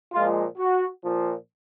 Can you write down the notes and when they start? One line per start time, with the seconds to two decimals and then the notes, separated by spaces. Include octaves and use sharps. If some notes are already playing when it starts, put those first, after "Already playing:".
0.13 A#2 F3 G#3 F4
0.58 F#4
1.02 A#2 F3